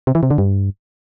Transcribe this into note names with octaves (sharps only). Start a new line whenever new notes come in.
C3
E3
C3
D3
G2